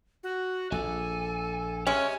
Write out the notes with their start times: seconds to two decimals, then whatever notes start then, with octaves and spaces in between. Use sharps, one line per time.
0.23 F#4
0.72 A#1 A4 G#5
1.87 G#3 C#4 G4 E5 G#5